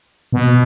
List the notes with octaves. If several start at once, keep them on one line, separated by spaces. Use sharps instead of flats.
B2